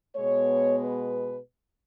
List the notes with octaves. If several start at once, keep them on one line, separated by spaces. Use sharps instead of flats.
B2 G#3 B3 C#5
B4